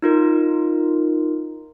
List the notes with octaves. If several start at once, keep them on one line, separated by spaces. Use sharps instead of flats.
D#4 F4 A#4